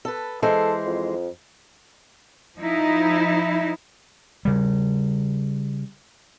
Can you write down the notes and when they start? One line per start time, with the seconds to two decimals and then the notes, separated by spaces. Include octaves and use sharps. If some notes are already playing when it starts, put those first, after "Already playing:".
0.05 A4 B4
0.43 E3 G#3 A4 C5
0.86 F2
2.57 F3 D#4 E4
4.45 C#3 G3